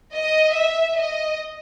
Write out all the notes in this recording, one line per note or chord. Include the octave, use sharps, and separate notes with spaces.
D#5
E5
D#5